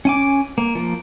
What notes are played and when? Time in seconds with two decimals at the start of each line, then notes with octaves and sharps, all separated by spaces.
0.05 C#4 G#5 D6
0.58 A#3
0.75 F3 A#3